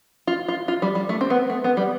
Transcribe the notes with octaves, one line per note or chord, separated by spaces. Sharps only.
F4
F4
F4
G3
G3
A3
C4
B3
A3
B3
G3